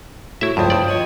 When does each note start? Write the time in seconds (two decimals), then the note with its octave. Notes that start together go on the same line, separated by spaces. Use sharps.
0.41 A2 E4 F#4 E5
0.57 C#2 G2 F3 C5 G5 D#6
0.70 G2 D5
0.88 C#5 D#5